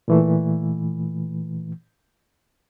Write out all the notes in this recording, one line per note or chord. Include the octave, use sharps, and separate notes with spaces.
A#2 E3 A3